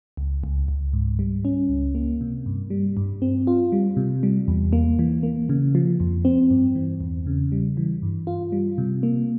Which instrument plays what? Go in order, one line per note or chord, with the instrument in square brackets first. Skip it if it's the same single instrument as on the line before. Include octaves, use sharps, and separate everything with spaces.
[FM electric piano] C#2
C#2
C#2
G#2
G3
C#4
C#2
A#3
C3
G2
G3
G2
C4
F4
G3
C3
G3
E2
A#3
E3
A#3
C#3
F3
F2
C4
G2
E3
E2
C#3
G3
E3
G2
F4
G3
C3
A#3